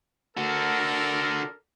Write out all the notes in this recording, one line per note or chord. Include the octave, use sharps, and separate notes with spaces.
D3 F#4 A4 A#4